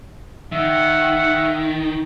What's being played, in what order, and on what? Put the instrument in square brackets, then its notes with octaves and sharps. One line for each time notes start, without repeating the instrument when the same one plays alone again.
[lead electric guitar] D#3 [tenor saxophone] E5 [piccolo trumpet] F#5